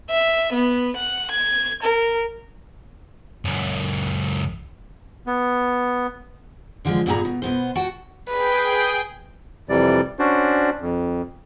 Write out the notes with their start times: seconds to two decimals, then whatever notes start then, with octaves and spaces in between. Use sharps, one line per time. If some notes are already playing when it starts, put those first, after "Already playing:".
0.10 E5
0.53 B3
0.95 F#5
1.31 G#6
1.81 A#4
3.45 C#2 F#2
5.27 B3
6.85 D3 F3 G#3
7.06 G2 A#2 B3 G4 G#4 A#5
7.25 B2
7.42 B2 B3 C5
7.75 F#4 F#5 G5 A5
8.28 G#4 B4 G5
9.69 F2 C3 E3 G3 D5
10.19 C#4 D4 F#4 C5 D5
10.81 F2